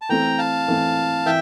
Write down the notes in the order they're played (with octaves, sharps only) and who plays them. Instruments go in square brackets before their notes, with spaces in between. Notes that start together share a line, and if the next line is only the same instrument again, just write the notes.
[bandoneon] A5
[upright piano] E3 A3 C4 [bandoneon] G5 A#5
[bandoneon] F5 A5
[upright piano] E3 A3 C4
[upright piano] E3 [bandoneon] E5 G5